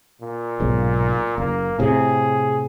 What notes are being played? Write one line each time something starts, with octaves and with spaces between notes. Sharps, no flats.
A#2
B1 G#2
F#1 A#3
A2 C3 G#4